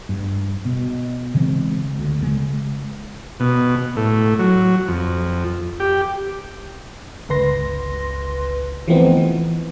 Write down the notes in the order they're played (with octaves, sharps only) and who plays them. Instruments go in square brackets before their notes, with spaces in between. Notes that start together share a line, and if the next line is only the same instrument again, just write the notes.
[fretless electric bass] G2
B2
C#3 E3 G#3 C4
D2
C#3 G#3
[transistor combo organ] B2
A2
F#3
F2
G4
[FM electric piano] G1 C#2 B4 C6 A#6
E3 F3 A3 B3 C4 D#4
E3